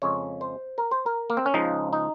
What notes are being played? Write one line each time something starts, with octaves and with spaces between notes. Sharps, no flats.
F2 C#3 G#3 C#5
C5
A#4
C5
A#4
A#3
C4
C#4
C#2 C#3 F3 G#3 D#4
D#4